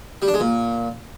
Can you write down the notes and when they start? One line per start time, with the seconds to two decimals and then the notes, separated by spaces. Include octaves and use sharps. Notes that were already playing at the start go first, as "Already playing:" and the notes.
0.22 G3
0.28 D4
0.34 G#3
0.40 A#2